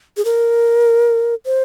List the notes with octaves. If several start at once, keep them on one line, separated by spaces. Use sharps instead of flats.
G#4
A#4
C5